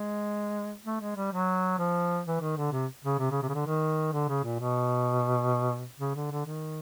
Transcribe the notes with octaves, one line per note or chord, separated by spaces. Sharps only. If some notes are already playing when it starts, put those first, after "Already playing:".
Already playing: G#3
A3
G#3
G3
F#3
F3
E3
D#3
D3
C3
C#3
C3
C#3
C3
C#3
D3
D#3
D3
C#3
A#2
B2
C#3
D3
D3
D#3